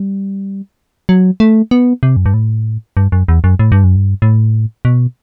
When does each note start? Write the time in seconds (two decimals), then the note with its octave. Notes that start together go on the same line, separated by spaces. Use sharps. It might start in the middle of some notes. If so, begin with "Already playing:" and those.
Already playing: G3
1.09 F#3
1.40 A3
1.71 B3
2.03 C3
2.16 F#2
2.26 G2
2.34 A2
2.97 G2
3.12 F#2
3.28 E2
3.44 F#2
3.59 A2
3.72 G2
3.84 F#2
3.96 G2
4.22 A2
4.85 B2